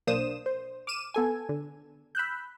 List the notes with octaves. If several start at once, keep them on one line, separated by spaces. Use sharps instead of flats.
B1 A#3 D4 C5 D#6 E7
C5
D6 F6 D#7 E7
B3 A4 G#5
D3
B5 E6 F#6 G6